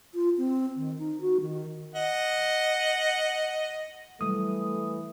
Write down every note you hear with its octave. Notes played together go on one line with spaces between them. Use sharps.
F4
C4
D#3
D#4
F#4
D#3
D#5 F#5
E3 F#3 G3 A3 D#6